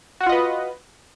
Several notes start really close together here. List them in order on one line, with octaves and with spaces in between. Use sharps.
F#4 F#5 F4 D#5 B4